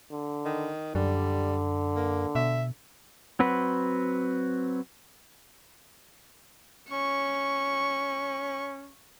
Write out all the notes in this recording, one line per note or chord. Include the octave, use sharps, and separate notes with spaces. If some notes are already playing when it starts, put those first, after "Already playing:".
D3
D#3
F#2 D3 G3
A#3
B2 E5
F#3 C4 F#4 B4
C#4 C#6